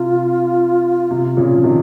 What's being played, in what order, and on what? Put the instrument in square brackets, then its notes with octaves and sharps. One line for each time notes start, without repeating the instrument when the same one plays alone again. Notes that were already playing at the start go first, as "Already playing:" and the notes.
Already playing: [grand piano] C3 [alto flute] F4
[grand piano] C3
A#2 C#3
F3
C3 D#3